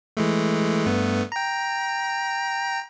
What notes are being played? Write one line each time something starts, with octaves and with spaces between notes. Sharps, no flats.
E3 G#3 A3
G2 A3 B3
G5 A#5